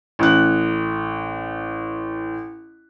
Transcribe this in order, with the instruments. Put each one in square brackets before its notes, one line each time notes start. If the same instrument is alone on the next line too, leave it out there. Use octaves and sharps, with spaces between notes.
[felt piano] A1 F#6